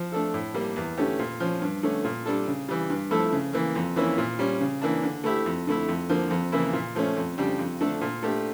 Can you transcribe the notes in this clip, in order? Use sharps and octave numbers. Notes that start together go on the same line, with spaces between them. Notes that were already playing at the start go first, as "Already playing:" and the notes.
Already playing: F3
A3 D4 A4
A2
G3 A#3
E2
D3 A3 C#4 G4
A#2
F3 C#4
G2
D3 A3 C#4
A#2
G3 D4 A4
C#3
E3 G3
G2
F3 A3 E4 A4
C#3
E3 A#3
F2
E3 A#3 C#4 E4
A#2
G3 C#4
C#3
E3 A#3 D4
D3
A3 E4 G4
F2
D3 A3 E4
F2
D3 F3 A#3
F2
C#3 E3 A#3 E4
A#2
F3 A3 C#4
F2
C#3 G3 D4 G4
F2
D3 A3 D4 A4
A#2
A3 D4 G4